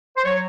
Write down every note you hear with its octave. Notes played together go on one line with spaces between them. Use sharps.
C5
F#3 C#5